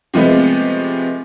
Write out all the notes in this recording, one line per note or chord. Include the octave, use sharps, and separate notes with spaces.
C3 F3 G#3 A3 B3